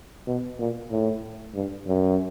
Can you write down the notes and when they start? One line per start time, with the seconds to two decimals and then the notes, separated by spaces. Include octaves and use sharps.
0.27 B2
0.59 A#2
0.91 A2
1.55 G2
1.87 F#2